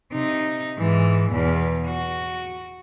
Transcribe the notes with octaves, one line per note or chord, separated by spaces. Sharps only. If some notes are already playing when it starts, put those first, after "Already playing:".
C3 D#4
G#2 E3
E2 B2
F#4